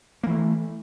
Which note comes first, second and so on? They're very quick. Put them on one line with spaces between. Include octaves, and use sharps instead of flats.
A#3 E3 A3